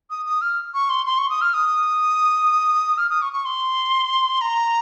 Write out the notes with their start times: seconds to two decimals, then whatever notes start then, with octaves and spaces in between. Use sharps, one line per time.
0.10 D#6
0.26 D#6
0.41 F6
0.74 C#6
0.90 C6
1.06 C6
1.18 C#6
1.30 D#6
1.41 F6
1.54 D#6
2.98 F6
3.10 D#6
3.22 C#6
3.33 C#6
3.45 C6
4.41 A#5